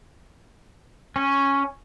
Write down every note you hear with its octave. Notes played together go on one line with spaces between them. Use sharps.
C#4